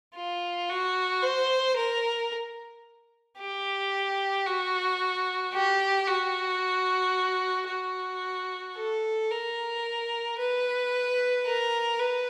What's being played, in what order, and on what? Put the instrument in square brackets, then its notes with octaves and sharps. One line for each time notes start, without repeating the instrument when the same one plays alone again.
[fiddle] F4
F#4
C5
A#4
G4
F#4
G4
F#4
F#4
A4
A#4
B4
A#4
B4